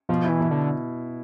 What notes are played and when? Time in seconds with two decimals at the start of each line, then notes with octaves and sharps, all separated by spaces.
0.09 B2 F3
0.24 E4
0.29 E3
0.41 B2
0.51 D3